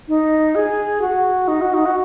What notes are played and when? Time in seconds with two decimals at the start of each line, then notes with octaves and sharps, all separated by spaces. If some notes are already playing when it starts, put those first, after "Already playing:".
0.08 D#4
0.55 G#4
1.02 F#4
1.48 D#4
1.61 F#4
1.74 D#4
1.86 F#4